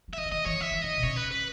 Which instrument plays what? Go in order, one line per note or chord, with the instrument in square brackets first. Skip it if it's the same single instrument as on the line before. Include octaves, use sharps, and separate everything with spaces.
[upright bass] F#3
[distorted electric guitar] E5
[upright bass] E3 [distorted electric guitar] D#5
[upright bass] C#3
[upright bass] D#3 [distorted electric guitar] D#5
[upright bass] E3 [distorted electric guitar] C#5
[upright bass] D#3 [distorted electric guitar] E5
[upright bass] E3
[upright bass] D#3 [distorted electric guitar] D#5
[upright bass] B2
[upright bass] C#3 [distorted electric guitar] C#5
[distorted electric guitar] B4
B4